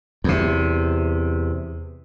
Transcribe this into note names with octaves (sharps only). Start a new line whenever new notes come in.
E2 C3